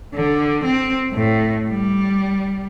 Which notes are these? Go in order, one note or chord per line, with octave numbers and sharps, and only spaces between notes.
D3
C4
A2
G3